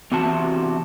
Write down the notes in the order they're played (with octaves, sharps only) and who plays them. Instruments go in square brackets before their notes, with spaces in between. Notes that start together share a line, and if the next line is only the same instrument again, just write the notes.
[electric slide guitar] E2 C3 E3 C4 F#4 A5